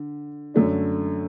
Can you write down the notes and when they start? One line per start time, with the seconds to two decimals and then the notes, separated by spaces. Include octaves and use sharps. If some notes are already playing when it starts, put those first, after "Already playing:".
Already playing: D3
0.54 F#2 D3 A3 D4